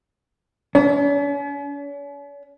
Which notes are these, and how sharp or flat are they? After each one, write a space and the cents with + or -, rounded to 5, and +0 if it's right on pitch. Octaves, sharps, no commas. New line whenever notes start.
C#4 +45